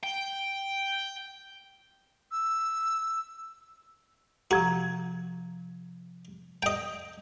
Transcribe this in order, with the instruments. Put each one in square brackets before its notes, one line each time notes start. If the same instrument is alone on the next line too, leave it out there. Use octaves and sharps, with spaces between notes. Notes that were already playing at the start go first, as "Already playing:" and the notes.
[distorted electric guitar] G5
[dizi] E6
[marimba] C3 F3 A#5 [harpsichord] F#4
[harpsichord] D#5 G5